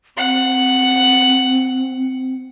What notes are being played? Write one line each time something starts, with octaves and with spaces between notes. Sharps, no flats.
C4 F#5